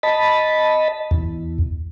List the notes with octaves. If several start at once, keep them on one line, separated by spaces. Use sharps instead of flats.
D#5 A5 B5
E2